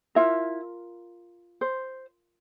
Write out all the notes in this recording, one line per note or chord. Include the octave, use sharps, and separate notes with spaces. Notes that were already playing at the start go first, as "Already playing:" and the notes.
E4 F4 A#4 E5
C5